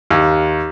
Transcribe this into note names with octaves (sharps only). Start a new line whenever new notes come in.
D#2